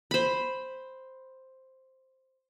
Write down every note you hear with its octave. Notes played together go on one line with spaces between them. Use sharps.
C5 B5